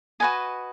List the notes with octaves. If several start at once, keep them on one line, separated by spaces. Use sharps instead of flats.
F#4 B4 D#5 G#5